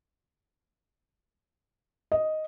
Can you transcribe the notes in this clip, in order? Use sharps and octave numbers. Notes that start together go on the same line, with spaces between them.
D#5